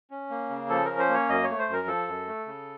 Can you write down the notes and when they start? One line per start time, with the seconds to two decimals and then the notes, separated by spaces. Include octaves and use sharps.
0.11 C#4
0.30 A#3
0.50 C#3
0.69 F3 A4
0.85 C#4 A#4
0.99 C5
1.09 A#3
1.14 C#5
1.29 F#2 D#5
1.44 C#5
1.49 A3
1.59 C5
1.68 F#2 A#4
1.87 F3 A4
2.08 F#2
2.28 A3
2.46 C#3